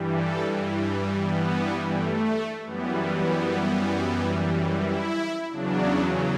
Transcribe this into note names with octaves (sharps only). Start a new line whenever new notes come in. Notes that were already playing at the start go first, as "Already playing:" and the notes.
Already playing: G2 E3 G3
A4
B3
A3
F#2 E3 G3 B3
B3
E4
E2 C#3 F#3 D4